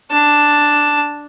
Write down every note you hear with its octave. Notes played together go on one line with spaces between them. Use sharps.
D4 A5